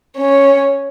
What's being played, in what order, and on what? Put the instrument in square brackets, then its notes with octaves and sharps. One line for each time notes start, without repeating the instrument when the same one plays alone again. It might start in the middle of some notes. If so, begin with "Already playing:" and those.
[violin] C#4